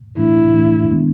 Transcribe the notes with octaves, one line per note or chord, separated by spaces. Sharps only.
A2 E3 A3 D4 E4
A2 E3 A3 D4
D#3 G#3 B3 D4